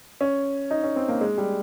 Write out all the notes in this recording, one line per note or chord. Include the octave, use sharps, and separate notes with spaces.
C#4
D#4
C#4
C4
A#3
G#3
G3